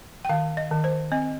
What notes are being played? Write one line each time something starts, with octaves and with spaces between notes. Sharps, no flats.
G5
D#3 F5
D#5
D#3
C5
C4 D#5